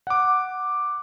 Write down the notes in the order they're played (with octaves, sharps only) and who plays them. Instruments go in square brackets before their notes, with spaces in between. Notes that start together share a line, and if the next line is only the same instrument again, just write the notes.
[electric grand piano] F#5 D6